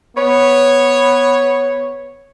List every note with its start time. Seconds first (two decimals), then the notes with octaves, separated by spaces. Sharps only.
0.17 B3 C#5